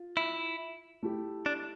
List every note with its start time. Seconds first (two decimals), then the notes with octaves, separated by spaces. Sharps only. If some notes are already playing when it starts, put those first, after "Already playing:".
Already playing: F4
0.17 E4
1.03 A3 E4 G4
1.46 D4